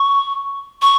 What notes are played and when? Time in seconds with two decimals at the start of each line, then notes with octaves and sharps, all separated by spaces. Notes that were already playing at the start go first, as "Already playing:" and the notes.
Already playing: C#6
0.82 C#6